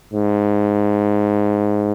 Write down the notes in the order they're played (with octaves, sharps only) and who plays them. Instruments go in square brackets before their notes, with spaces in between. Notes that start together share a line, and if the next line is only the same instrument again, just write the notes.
[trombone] G#2